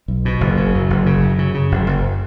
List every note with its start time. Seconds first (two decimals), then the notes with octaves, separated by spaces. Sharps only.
0.08 B1
0.25 B2
0.41 F#1
0.57 C#3
0.74 F#2
0.90 F#1
1.06 C#3
1.23 F#2
1.38 C#3
1.54 C#3
1.72 F#1
1.87 F#1